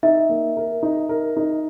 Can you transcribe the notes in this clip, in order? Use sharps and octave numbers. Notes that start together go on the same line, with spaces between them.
D#4 E5
A#3
A#4
D#4
A#4
D#4